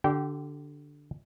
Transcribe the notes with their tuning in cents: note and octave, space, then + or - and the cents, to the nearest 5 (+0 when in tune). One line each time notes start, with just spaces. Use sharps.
D3 +0 G4 -30 G5 -20